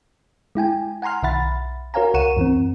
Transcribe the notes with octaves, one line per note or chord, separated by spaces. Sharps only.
G#3 E4 G5 G#5
F#5 G#5 A#5 C6 F6
B1 D#3 E5 F#5 B5 A6
F#4 A#4 C#5 F5 G#5 A#5
C#2 A#4 F#5 C#6 D#7 E7
F#2 E3 C4